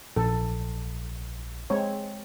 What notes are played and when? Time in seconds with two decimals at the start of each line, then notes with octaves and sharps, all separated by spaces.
0.16 A#1 A4
1.70 G#3 C4 C#5